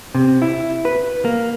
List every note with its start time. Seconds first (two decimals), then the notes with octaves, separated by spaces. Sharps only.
0.15 C3
0.42 E4
0.85 B4
1.25 A#3